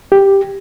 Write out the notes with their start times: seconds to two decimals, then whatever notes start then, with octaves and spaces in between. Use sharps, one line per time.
0.12 G4